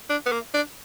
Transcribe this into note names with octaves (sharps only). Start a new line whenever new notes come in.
D4
B3
A#3
D4